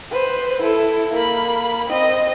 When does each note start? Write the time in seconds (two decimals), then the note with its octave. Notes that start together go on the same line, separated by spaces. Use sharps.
0.11 B4 C5
0.62 E4 A4
1.13 A#3 B5
1.88 C4 D#5